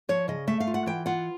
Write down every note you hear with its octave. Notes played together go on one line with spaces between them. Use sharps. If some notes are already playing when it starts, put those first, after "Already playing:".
F3 C#5
C#3 D#5
A3 E5
F5
F4
F#5
E3 G5
F4 F#5